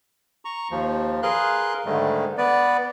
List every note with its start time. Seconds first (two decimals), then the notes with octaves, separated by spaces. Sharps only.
0.45 A#5 C#6
0.71 D#2 F3
1.23 G#4 A#4 B4 F5 C6 F#6
1.85 G#2 D3 D#3 G3 A3
2.38 B3 B4 D5